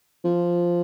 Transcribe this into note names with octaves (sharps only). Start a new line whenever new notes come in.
F3